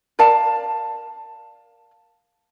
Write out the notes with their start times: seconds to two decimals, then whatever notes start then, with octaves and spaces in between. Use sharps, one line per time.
0.19 A#4 D5 F5 A5